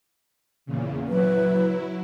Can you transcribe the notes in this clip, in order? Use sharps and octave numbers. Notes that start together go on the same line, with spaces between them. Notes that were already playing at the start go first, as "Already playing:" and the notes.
E2 A#2 C#3
F#3 E4 B4